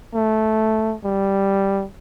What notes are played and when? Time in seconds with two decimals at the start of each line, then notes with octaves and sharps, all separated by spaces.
0.14 A3
1.04 G3